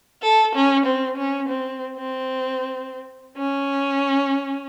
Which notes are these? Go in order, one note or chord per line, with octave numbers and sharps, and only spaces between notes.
A4
C#4
C4
C#4
C4
C4
C#4